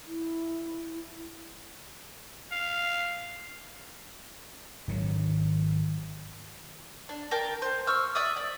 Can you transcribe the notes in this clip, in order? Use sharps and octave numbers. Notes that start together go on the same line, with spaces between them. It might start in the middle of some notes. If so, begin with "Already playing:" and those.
E4
F5
G#1 D#3 F#3
D4
A#4 G5 A5
C5
C#6 E6 F6
D5 E5 D#6
D5